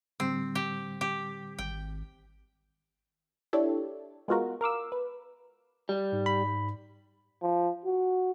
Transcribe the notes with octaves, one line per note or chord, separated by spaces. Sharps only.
A2 D3 G3 C4
G4
G4
G#1 G5
D4 E4 G4 A4 C#5
G#3 B3 F4 F#4 A#4
A#4 F5 D6 E6
B4
G3
G#2
B5
F3
F#4